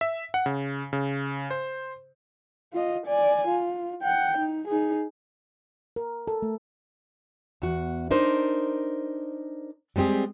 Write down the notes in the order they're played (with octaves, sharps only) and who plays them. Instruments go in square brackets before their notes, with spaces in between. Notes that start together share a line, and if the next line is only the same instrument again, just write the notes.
[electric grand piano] E5
F#5
C#3
C#3
C5
[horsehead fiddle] F4 D#5
D5 G#5
F4
F#5 G5
D#4
D#4 G#4
[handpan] A#4
A4
A3
[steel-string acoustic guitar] E2 F#4
D4 D#4 A#4 C5
G3 G#3 C4 G4 G#4